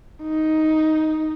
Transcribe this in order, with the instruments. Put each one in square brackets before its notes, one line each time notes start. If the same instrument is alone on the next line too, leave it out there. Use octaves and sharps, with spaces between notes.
[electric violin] D#4